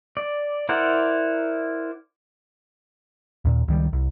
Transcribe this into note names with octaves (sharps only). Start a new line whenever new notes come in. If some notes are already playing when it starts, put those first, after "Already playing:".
D5
E4 A#4 C5 D5 F#5
D#2 A#2
C#2 D#3 G3
C2